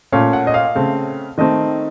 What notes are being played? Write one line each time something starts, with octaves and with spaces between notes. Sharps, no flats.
A#2 A3 C#4 F5
F#5
D#5
F5
C#3 A3 C4
D#3 A3 C4 D#5